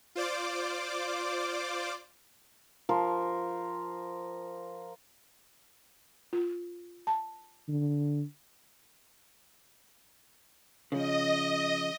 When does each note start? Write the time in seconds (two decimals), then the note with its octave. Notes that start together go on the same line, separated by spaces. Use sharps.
0.15 F4 C5 D5 D6
2.89 F3 A#4 C5
6.33 F4
7.07 A5
7.68 D3
10.92 C#3 F3 D#5